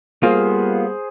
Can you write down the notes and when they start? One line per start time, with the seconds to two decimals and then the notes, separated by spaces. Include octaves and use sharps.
0.23 G3 A#3 B3 F4 G#4 C5